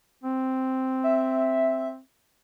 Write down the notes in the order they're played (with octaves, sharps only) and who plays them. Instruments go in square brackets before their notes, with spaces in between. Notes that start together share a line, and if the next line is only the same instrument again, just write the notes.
[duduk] C4
[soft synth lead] E5